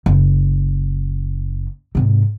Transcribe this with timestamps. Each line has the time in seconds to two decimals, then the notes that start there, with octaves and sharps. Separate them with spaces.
0.06 F#1
1.95 G#2 C3